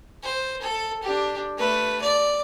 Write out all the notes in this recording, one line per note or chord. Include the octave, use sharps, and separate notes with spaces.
C5
A4
D4 G4
A3 B4
D5